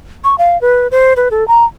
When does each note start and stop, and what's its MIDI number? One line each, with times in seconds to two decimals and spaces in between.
0.24 0.37 85
0.38 0.60 77
0.61 0.88 71
0.91 1.13 72
1.17 1.29 71
1.31 1.46 69
1.48 1.65 82